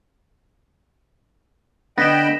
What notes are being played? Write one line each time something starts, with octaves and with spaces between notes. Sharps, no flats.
D3 B3 D#5 G5 B5 A#6 B6 E7